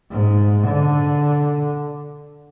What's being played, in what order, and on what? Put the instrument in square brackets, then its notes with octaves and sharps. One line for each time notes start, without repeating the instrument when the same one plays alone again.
[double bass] G#2
D3